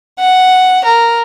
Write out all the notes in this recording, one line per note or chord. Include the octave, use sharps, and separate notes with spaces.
F#5
A#4